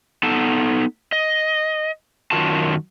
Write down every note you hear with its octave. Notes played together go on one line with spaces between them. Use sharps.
B3 D#4 A4 A5
D#5
F#2 D#3 F4 F#4 A5